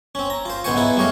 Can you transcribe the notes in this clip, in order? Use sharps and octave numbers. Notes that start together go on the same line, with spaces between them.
C4 C#4
A#5
F4 C5
C#2 G#2 B3 C5 G#5 C#6
B3 D#4 E4 G#4
G3 A3 C#5 D#5 F5